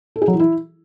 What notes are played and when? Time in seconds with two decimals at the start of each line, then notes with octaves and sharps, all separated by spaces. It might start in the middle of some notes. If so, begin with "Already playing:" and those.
0.16 A4
0.22 G#4
0.28 F#3
0.34 E3
0.40 E4